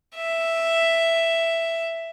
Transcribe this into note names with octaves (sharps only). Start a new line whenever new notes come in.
E5